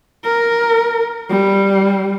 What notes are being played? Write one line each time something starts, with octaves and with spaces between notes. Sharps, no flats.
A#4
G3